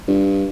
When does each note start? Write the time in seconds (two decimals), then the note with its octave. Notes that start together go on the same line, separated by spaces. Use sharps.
0.08 G2